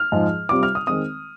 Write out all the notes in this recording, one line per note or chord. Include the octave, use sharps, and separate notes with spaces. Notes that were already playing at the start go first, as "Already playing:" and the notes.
Already playing: F6
G#2 F3 G#3
C3 G3 C4 F4 D6
F6
D#6
D#3 G#3 C4 D#6